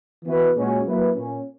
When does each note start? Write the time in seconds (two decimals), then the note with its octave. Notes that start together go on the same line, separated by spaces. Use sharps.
0.25 E3 B3 F#4 B4
0.55 A#2 G#3 C#4 F#4
0.84 F#3 A#3 E4 B4
1.14 A#2 A#3 C#4